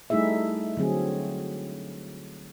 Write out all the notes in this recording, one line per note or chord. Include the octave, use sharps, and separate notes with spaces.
G3 A3 D#4 E4 G#4 E5
D3 F#3 C4 G#4